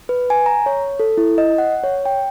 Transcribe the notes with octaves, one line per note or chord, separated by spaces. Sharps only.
B4
G#5
A#5
C#5
A4
E4
D#5
F#5
C#5
G5